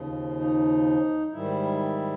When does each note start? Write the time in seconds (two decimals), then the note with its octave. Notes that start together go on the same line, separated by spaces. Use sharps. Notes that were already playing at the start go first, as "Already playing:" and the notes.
Already playing: D#2 C#3 F3
0.39 D#4
1.32 G#2 D#3 G3 E4